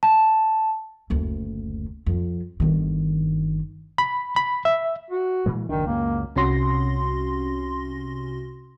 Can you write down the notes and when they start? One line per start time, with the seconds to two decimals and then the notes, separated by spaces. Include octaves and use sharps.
0.03 A5
1.10 F#1 D2
2.06 F2
2.60 G1 D#3
3.98 B5
4.36 B5
4.65 E5
5.11 F#4
5.46 A#2 E3 G#3
5.69 F#1 D2 D#3 D4
5.87 C#2 F#2 A#3
6.36 C2 C3 C#4 F#4 C6 A#6